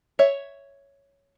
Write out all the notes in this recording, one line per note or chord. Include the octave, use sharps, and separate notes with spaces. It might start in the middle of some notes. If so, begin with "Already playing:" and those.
C#5 E5